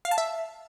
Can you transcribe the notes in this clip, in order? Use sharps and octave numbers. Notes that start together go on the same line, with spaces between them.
F5
A5
E5